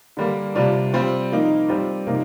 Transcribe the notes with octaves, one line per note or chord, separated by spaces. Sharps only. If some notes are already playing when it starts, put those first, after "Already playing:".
D3 G3 A#3
C3 G3 D4 F4
G3 C4 F4
F3 A#3 D#4
G3 C4 F4
C3 F3 A#3 D#4